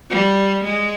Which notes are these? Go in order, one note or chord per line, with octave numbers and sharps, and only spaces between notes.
G3
G#3